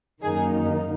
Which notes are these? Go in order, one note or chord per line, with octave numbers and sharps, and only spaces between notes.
F#2 D#3 A#3 D#4 G#4